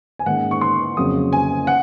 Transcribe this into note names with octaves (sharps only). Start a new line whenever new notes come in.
G#5
G#2 D#3 A#3 C#4 F#5
C#6
C6
F2 C#3 F#3 A#3 D#6
G#5
F#5